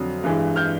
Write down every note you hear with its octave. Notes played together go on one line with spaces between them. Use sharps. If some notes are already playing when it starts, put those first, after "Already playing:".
Already playing: F2 D3 F#3
G2 E3 G#3
F6 G6